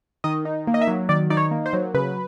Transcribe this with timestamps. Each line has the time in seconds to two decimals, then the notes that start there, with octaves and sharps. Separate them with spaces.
0.24 D#3 D#5
0.45 D#4
0.67 A#3
0.74 D#5
0.81 E5
0.87 F#3
1.09 D#3 D5
1.30 D#4 D5
1.37 C#5
1.51 A#3
1.66 C5
1.73 F#3
1.94 C#3 B4